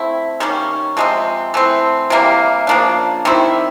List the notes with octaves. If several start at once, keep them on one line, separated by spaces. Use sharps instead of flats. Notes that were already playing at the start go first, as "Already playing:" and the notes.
Already playing: A3 C4 E4
D#3 G3 A#3 C#4
C3 F3 G#3 C4
E3 A3 C4
C3 E3 G3 A#3
C#3 F3 A#3 D4
D#3 G3 C4 E4